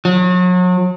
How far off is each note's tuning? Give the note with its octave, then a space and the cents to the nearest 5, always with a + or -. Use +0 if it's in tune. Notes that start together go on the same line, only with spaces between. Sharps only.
F#3 -35